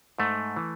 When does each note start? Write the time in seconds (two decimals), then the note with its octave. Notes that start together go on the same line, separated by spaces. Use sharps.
0.18 G#2 A3
0.56 E3